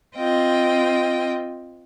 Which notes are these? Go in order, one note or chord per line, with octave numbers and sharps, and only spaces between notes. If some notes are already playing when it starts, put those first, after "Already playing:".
C4 F4 D#5 G5